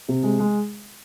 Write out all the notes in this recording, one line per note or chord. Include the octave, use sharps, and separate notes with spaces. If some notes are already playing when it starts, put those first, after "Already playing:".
C3
G#3
G#3